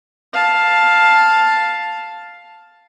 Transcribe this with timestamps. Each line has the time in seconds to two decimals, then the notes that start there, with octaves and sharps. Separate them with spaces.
0.33 F5 A5